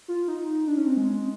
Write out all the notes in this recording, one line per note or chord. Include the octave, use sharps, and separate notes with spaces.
F4
D#4
D4
C#4
C4
G#3